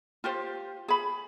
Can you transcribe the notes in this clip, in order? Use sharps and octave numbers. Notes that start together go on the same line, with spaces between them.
F4 G4 C5
G#4 B5